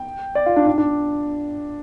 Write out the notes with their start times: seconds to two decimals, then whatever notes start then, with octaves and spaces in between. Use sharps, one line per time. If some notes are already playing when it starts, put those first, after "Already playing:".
Already playing: G5
0.35 D5
0.46 F4
0.56 D4
0.67 D4
0.78 D4